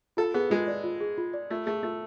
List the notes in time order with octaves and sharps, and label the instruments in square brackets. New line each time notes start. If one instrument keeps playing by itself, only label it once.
[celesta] F4 [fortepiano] A4
[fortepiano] B3 [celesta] G#4
[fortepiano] G#3 [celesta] F4
[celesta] D5
F4
G#4
F4
D5
[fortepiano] A3 [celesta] F4
[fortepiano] A3 [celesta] G#4
[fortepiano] A3 [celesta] F4